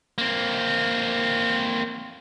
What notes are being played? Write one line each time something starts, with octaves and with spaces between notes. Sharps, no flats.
A#3 C4